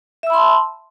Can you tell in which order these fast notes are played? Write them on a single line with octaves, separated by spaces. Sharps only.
E5 E6 B5 C6 A5